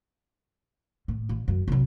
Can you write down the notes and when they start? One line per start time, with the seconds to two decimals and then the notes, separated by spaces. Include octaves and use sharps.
1.08 A2
1.29 A1
1.48 F#2
1.68 C2 F#3